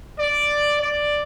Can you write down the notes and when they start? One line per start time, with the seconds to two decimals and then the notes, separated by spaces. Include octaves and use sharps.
0.20 D5
0.82 D5